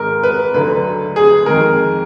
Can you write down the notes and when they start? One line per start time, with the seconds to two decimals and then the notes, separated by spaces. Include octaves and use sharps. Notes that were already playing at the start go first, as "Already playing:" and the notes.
Already playing: G#2 D#3 A#4
0.23 B4
0.54 D2 D3 F#3 B4
1.16 G#4
1.46 F2 D#3 G#3 A#4